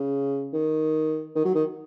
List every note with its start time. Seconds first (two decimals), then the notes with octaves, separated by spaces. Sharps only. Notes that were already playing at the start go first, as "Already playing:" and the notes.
Already playing: C#3
0.53 D#3
1.35 D#3
1.45 F#3
1.55 D#3